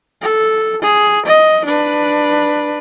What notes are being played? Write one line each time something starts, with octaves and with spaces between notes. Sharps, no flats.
A4
G#4
D#5
D4 B4